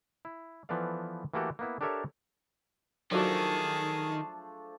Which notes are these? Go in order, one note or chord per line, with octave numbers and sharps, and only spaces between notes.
E4
E3 F3 B3 A4 D5 F5
E3 A3 A#3 F#4 G4 A4
A#3 B3 E4
D4 G4 A4 A#4 C#5 E5
D#3 F3 F#3 A3 D4 F#4 G#4 A5